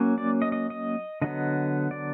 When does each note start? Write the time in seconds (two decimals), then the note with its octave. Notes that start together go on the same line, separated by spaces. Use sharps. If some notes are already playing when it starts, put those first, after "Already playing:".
Already playing: F#3 A#3 C#4
0.18 D5
0.42 D#5
0.52 D#5
0.70 D#5
1.22 D3 F#3 B3 D#5
1.91 D5